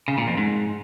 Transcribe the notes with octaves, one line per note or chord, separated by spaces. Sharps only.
C#3
A#2
F2
G#2